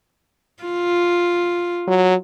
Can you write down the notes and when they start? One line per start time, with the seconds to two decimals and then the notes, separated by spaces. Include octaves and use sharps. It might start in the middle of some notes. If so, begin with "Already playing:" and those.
0.63 F4
1.87 F#3